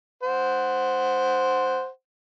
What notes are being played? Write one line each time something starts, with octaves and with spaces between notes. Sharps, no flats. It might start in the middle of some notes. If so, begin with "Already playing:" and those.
C5 F#5